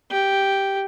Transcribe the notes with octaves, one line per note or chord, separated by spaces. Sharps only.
G4